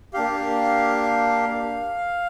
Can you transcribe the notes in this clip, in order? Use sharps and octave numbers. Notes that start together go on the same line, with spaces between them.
A#3 D4 G4 F5